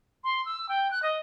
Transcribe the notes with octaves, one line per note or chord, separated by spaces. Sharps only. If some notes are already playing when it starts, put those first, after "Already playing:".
C6
E6
G5
F#6
D#5